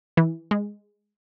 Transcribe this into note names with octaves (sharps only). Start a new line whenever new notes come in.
E3
G#3